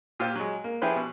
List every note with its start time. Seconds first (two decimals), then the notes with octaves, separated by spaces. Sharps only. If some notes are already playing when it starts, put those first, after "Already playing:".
0.20 A#2 F4 G4 C5 F6
0.35 F#3 G#3
0.64 A#3
0.82 F3 E4 G4 G#4 B4 C5
0.96 B2